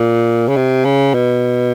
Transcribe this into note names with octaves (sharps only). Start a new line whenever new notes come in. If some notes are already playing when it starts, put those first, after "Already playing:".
Already playing: A#2
C#3
C3
C#3
B2